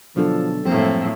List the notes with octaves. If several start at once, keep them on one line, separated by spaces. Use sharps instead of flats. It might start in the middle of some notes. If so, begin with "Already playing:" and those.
B2 D3 F3 F#3 D4 A4
F#2 A2 F3 G3 A#3 C4